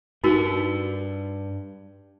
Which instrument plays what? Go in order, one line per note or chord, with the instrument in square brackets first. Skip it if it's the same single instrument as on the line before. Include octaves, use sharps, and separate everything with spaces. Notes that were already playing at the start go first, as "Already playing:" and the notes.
[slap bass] G2 [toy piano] D#4 F#4 A#4